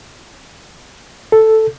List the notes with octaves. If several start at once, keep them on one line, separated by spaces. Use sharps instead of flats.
A4